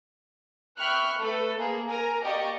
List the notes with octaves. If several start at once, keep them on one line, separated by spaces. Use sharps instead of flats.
E5 G5 B5 C#6 F6 F#6
A3 A4 B4
A#3 G#4
A#4 G#5 A#5
A#3 G4 D5 D#5 C#6